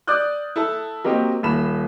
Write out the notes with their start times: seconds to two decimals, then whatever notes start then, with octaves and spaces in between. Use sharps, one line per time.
0.07 D5 D6 D#6 F#6 G6
0.56 E4 A4 A5
1.04 F#3 A#3 C4 G4 D#5
1.43 D#1 B5 E7